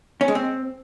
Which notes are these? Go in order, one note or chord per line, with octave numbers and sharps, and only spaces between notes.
C#4
G#3
C4